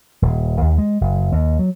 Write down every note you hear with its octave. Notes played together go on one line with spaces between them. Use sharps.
D#1
D#2
G#3
F#1
D#2
F#3